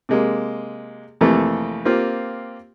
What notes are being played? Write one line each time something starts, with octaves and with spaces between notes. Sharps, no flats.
C3 G#3 A#3
F2 C3 E3 A3 A#3
A#3 C4 F4 G4